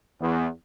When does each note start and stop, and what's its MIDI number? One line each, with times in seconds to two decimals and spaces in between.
0.21 0.47 40